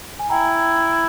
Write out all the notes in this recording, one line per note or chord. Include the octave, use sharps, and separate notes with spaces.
G#5
E4 G5 A#5